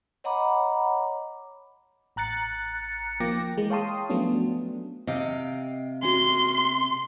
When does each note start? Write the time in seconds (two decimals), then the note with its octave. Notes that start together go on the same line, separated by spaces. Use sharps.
0.24 C#5 D#5 F#5 A#5 B5 D6
2.16 A1 A#5 F#6 A6 C#7
3.20 D#3 F3 A#3 G5 D6 A#6
3.58 E3 G#3
3.70 C#5 F5 G5 A5 C6 D#6
4.09 F3 F#3 A3 B3 C#4 D4
5.07 C3 D#5 F5 G5
6.03 C#4 F#4 C6